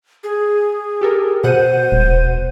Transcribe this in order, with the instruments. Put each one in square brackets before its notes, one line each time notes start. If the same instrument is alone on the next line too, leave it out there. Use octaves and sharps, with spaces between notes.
[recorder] G#4
[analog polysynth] G4 A4 A#4
[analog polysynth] B2 F#5 D#7 [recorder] C5
[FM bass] D#1